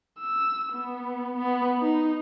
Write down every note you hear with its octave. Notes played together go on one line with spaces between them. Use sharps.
E6
B3
B3
D#4